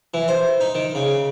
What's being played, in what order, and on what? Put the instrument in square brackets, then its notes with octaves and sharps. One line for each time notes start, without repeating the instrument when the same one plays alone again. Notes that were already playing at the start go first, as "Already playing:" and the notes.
[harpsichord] E3
C5
D#4
D#3
C#3